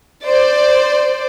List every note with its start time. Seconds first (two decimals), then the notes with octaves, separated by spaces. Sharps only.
0.25 C5 D5